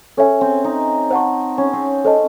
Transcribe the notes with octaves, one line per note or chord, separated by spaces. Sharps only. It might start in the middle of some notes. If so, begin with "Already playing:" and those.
C#4 A4 C#5 E5 G#5
C4
D#4
C5 F#5 A5 C#6
C#4
C4
C#4 A4 C5 D#5 A5